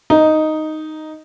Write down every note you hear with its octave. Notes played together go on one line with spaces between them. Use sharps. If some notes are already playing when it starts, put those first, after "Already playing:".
D#4